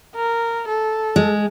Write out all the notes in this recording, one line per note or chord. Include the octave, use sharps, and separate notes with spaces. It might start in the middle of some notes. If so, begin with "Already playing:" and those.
A#4
A4
G#3